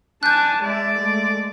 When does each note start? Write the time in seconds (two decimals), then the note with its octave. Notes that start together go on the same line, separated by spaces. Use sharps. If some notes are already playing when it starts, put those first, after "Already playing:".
0.23 D4 G#5 A5 F#6 G6
0.63 G#3 D5 E5
0.99 G#3 A3